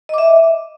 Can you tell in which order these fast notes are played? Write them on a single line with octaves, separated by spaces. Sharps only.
D#5 D6 E5